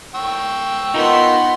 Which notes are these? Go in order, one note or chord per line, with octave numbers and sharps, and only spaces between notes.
G5 C#6 E6
B3 D#4 F4 A#4 C6